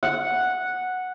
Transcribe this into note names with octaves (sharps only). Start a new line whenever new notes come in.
F#5